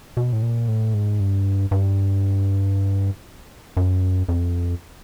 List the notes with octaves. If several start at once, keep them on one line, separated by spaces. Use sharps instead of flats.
B2
A2
A#2
A2
G#2
G2
G2
F#2
F2